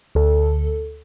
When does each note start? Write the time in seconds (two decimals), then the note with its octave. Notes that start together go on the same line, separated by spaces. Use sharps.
0.15 D2 A4